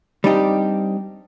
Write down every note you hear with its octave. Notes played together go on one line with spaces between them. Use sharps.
G3 C4 D4 D#4 G4